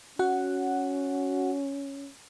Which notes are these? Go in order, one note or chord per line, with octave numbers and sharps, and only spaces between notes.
C#4 F#4 F#5